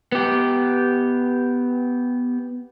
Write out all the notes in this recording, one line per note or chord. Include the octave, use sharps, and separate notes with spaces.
B3 G4